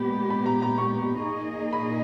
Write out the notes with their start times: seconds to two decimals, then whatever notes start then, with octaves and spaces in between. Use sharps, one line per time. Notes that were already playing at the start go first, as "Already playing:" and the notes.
Already playing: A#2 G#3 B3 G4 B5
0.30 B5
0.46 A#5
0.62 A#5
0.78 C#6
1.25 A#2 A#3 D#4 G#4 D#5
1.73 B5